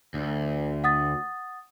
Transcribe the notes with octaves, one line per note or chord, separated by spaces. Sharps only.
D2
F#5 D#6 A6